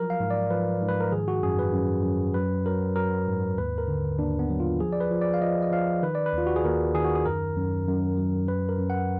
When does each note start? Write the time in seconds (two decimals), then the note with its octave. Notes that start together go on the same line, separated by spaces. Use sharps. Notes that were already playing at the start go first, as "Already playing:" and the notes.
Already playing: F3 F#3 A#4
0.10 F5
0.20 G#2
0.31 D5
0.50 F3 B4
0.82 G#2
0.88 B4
1.00 A#4
1.12 D#3 G#4
1.28 F#4
1.43 F#2 G#4
1.59 B4
1.73 F#2
2.04 F#2
2.34 F#3 B4
2.66 F#3 A#4
2.96 F#3 A#4
3.27 G#2
3.58 D#2 B4
3.78 A#4
3.88 D3
4.18 D#2 D4
4.39 B3
4.50 F#3
4.60 F4
4.80 F3 G#4
4.93 D5
5.00 B4
5.11 F3
5.22 D5
5.34 F5
5.41 F3 D#5
5.62 D#5
5.72 F3 F5
6.03 D#3 B4
6.15 D5
6.26 B4
6.33 D#2 F4
6.46 F#4
6.56 G#4
6.65 D#2 A#4
6.94 D#3 G#4
7.05 F#4
7.15 G#4
7.26 F#2 A#4
7.56 F#2
7.87 F#2
8.17 F#3
8.48 F#2 B4
8.69 A#4
8.79 F#2
8.90 F#5